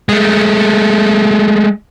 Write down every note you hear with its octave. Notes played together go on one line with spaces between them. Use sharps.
G#3 A3